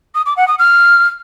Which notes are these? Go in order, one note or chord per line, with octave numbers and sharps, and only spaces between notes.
D#6
D6
F#5
D#6
F6